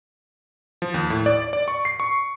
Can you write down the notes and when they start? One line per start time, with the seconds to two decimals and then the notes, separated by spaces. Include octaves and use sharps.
0.82 F3
0.94 D#2
1.10 A2
1.26 D5
1.53 D5
1.68 C#6
1.85 C7
2.00 C#6